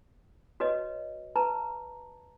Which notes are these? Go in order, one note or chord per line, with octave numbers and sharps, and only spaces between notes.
F#4 B4 C#5 D#5
B4 A5 A#5